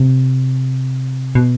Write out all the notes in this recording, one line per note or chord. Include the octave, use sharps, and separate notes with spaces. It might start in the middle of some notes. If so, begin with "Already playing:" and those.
Already playing: C3
B2